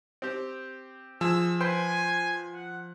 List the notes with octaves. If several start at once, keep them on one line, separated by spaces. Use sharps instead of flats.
C4 G4
F3 G#4 E6
B4 C5 G5 G#5
F#5